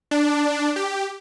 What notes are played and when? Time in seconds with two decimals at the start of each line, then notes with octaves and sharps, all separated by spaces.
0.11 D4
0.76 G4